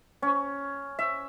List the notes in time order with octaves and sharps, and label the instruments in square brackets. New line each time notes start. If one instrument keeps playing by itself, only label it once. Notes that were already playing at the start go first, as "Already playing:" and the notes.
[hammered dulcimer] C#4
E5